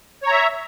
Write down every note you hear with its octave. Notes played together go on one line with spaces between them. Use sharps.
C#5 E5 A#5